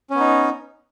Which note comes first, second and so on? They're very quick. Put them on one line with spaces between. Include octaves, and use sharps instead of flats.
C#4 B3 D#4